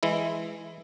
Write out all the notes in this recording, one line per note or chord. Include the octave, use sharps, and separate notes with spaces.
E3 G#3 E4